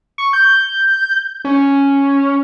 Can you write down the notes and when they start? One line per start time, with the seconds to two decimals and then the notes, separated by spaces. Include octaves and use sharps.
0.18 C#6
0.33 G6
1.45 C#4